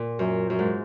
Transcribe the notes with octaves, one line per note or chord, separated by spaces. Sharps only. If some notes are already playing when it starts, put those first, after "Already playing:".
Already playing: A#2
F#2
F#2
G#2